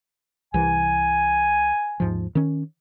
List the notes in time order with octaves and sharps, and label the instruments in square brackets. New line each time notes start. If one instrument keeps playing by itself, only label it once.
[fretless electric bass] C2 E3 [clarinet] G#5
[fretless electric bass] D#2 G#2 F3
D#3 C#4